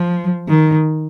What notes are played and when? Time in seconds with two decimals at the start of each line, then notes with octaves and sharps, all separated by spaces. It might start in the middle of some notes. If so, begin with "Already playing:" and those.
Already playing: F3
0.48 D#3